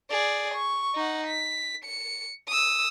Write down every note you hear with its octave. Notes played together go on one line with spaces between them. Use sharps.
G#4 D5
C#6
D#4 F#5
B6
C#7
D#6 E6